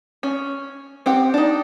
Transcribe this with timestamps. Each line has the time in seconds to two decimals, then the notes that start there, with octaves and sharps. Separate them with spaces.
0.23 C#4
1.06 C4 G4 F#5
1.34 D4 D#4